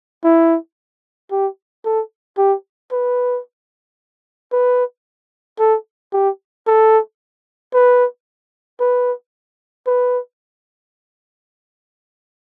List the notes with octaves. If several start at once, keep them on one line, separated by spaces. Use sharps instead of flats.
E4
G4
A4
G4
B4
B4
A4
G4
A4
B4
B4
B4